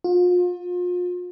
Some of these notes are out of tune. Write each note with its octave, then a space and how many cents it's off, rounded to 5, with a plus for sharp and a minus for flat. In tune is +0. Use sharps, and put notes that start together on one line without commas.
F4 +35